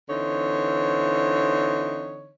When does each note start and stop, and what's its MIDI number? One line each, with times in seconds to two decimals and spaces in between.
0.10 2.32 50
0.10 2.32 52
0.10 2.32 60
0.10 2.32 63
0.10 2.32 73